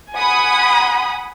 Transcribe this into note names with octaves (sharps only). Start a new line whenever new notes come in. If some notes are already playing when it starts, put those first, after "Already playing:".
F#5 G#5 B5 D#6